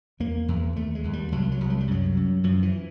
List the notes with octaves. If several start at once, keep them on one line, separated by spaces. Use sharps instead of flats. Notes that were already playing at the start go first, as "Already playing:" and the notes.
E2 A#3
E2
D#2 A3
G#3
D#2
G3
C2 F#3
F#3
C2
F#3
G3
F#2 F#3
F#2
F#2 F3
E3